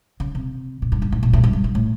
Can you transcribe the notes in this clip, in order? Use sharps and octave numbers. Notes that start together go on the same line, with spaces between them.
C#3
C3
A#2
G#2
G#2
A2
A#2
A2
G#2
G2
G2
A2